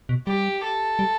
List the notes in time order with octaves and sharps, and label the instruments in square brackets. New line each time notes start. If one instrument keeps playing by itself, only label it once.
[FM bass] B2
[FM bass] G3 [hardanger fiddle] G4
[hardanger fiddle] A4
[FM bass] G3